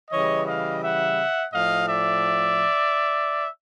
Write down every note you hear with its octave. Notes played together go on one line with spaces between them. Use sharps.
C#3 E3 G3 C#5 D#5
D#5 F5
E5 F#5
A2 F3 D#5 F5
D5 E5